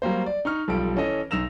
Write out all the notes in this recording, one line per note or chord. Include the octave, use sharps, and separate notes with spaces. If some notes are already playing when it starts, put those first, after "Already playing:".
F#3 G3 A#3 C5
D5
D#4 C#6 F6
B1 F3 G3 A4 D7
E3 C#4 A4 D#5
B1 D#4 E6 A#6 E7 F7